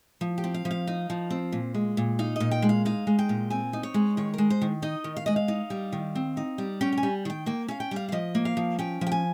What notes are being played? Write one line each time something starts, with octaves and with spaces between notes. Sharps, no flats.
F3
G4
C4
F5
F3
F5
D#4
F3
C4
A#2
G#3
A#2
D#4 F5
A#2 D#5
G5
G#3
F5
D#4 F5
G#3
G5
A#2
C4 G#5
D#4
C#5
G#3
D#3 C#5
G#3 A#4
C5
D#3
D#4 D#5
D#3
F5
G#3 D#5
F5
D#4
G3
D#3
C4
D#4
G3
C#4 G5
G5
G#5
G3
D#3 G5
A#3 G5
C#4 F5
G5
G3 F5
F5
F3 D#5
A#3
F5
F3
C#4 G5
F3
G5
G#5